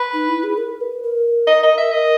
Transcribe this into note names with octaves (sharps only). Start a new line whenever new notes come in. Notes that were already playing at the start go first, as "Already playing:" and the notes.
Already playing: B4
D#4
E4
G#4
A#4
B4
A#4
D#5
D#5
E5
A#4 D#5